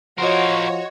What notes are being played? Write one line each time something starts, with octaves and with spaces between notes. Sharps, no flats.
F3 F#4 A#4 C5 C#5 D#5 C6